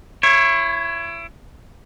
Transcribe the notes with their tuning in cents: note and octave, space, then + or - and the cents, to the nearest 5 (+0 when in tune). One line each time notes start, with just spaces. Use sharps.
E4 +30 C#5 -15